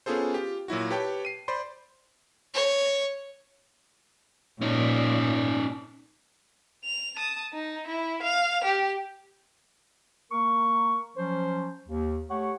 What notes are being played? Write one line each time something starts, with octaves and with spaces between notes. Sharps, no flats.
B3 C#4 F4 G#4 A4 C5
F4 G4
A#2 F#3 E4 F#4
G4 B4 C#5 G5 A5
C7 D#7
C5 D5 B5 C6
C#5
A#2 C#4 D#4
F7
A5 D#6
D#4
E4
F5 F7
G4
A#3 A#4 C#6
F3 F#3 C#4 C5
D#2
A3 G4 C#5 F#5 C#6